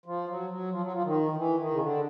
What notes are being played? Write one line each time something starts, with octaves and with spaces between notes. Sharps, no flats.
F3
F#3
F#3
F3
F#3
F3
D#3
D#3
E3
D#3
C#3
D3